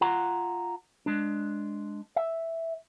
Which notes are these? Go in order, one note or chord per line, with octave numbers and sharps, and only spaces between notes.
F4 F#5 A#5
G#3 D4
E5